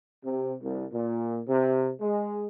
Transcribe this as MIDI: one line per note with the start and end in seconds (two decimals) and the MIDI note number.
0.24 0.53 48
0.61 0.85 36
0.92 1.39 46
1.48 1.91 48
2.00 2.47 56